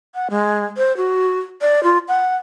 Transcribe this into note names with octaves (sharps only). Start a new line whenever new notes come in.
F#5
G#3
C5
F#4
D5
F4
F#5